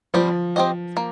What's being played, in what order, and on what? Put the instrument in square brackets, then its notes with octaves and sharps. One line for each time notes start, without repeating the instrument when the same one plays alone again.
[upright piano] F3 [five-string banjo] G3 C4 G4
[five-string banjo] C4 G4 C5 D#5
A#3